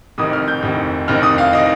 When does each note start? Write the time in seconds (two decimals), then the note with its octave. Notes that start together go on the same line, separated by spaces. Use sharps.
0.18 F1 F2 D#3 D#6
0.33 F6
0.48 G6
0.63 F1 F2 D#3
1.08 F1 F2 D#3 F6
1.23 D#6
1.38 F5
1.53 D#3 D#5